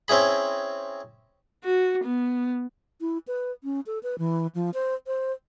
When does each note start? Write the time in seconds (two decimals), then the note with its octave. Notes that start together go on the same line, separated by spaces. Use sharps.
0.08 C4 C#4 E4 G#4 B5
1.64 F#4
2.04 B3
3.01 E4
3.28 B4
3.64 C#4
3.86 A4
4.03 B4
4.18 E3
4.55 F3
4.74 C5
5.07 C5